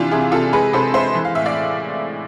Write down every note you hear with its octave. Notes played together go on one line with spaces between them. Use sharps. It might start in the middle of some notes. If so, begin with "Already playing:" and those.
Already playing: C3 E3 D4 F4
C3 E4 G#4
C3 F4 A4
G#3 G#4 B4
C3 A4 C5
G#3 C5 E5
E3
F5
A2 E5
D5 F5